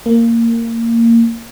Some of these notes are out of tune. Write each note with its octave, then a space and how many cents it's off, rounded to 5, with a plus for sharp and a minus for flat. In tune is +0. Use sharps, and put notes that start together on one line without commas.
A#3 -15